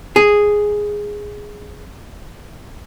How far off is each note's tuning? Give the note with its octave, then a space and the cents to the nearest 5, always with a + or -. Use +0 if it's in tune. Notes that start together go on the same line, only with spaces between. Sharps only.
G#4 +0